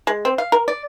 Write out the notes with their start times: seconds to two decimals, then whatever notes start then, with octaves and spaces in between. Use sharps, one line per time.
0.07 G#3
0.25 C4
0.38 F5
0.52 A#4
0.68 D5